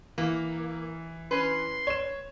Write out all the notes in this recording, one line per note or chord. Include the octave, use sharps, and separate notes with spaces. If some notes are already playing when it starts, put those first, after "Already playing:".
E3 A#3
C#4 B4 C6
C#5 E7